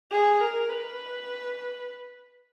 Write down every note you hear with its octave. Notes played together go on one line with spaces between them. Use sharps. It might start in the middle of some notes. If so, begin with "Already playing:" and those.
G#4
A#4
B4